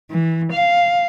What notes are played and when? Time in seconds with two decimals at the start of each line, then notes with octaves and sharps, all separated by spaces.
0.11 E3
0.52 F5